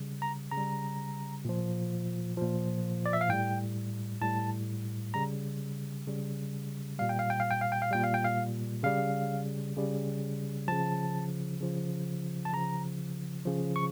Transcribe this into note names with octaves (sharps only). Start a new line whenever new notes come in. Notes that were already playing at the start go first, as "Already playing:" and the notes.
Already playing: C#3 G3
A#5
C#3 A#5
G3
A#2 F3
A#2 F3
D5
E5
F5
A2 G3 G5
A2 G3 A5
C#3 G3 A#5
C#3 G3
A#2 G3 F5
G5
F5
G5
F5
G5
F5
G5
F5
A#2 G3 G5
F5
G5
F5
C#3 G3 F5
C#3 G3
C#3 F3 A5
C#3 F3
A5
C#3 F3 A#5
C#3 F3
C#6